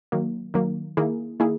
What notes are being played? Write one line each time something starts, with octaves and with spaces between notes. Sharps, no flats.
D#3 F#3 A#3
D#3 F#3 A#3
D#3 A#3 E4 G#4
D#3 A#3 E4 G#4